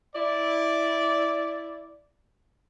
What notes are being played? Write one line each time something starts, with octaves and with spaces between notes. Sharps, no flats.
E4 D5